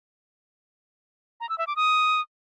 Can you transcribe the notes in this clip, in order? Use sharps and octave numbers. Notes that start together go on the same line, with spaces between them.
A#5
E6
E5
D6
D#6